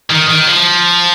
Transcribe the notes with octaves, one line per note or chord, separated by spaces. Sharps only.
D#3
D#3
F3